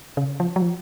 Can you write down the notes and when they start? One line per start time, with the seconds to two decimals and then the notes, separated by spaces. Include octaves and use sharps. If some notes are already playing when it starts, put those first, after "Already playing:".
0.17 C#3
0.40 F3
0.56 F#3
0.61 F3